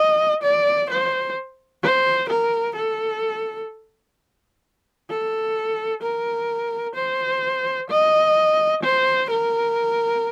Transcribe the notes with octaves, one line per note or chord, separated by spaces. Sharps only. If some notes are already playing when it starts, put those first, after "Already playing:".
Already playing: D#5
D5
C5
C5
A#4
A4
A4
A#4
C5
D#5
C5
A#4